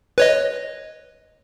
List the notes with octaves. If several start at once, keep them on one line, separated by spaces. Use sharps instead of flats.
B4 C#5 D#5